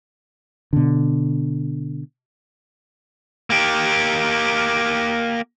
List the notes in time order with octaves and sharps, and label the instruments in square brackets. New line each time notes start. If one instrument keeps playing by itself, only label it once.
[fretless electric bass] B2 D3
[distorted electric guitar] A#3 G4